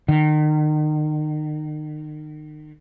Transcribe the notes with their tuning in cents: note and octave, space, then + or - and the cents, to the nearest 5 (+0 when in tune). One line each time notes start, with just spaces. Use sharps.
D#3 -35